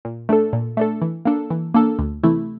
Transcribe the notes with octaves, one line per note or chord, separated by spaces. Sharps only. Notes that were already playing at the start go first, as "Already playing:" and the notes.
A#2
A3 D4 A4
A#2
A3 D4 A4
E3
A#3 D4 A4
E3
A#3 D4 A4
D2
C3 E3 A3 E4